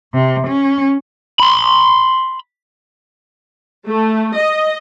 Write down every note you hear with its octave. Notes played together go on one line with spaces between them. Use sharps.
C3
C#4
B5 C6
A3
D#5